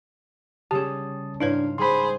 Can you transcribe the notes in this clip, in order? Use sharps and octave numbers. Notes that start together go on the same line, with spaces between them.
C#3 G3 C#4 G4 G#4 A5 D#6
G#2 D4 E4 B4 C#5 F5 C6
G3 G#4 C5 B5 C6